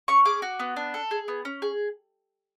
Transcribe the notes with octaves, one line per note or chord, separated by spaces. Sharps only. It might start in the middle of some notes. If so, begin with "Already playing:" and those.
C#4 C#6
G#4 D6
F#4
B3
D4
A4
G#4
B3
C#4
G#4